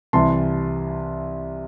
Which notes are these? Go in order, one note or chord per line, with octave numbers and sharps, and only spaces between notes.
C2 C3 E3 A5 C6